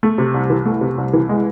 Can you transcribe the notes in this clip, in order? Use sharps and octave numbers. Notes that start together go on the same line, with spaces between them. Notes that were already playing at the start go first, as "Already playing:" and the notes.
A3
C3
C2
E3
A3
C3
C2
E3
G#3